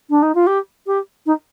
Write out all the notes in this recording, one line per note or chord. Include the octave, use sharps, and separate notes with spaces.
D4
D#4
F4
G4
G4
D#4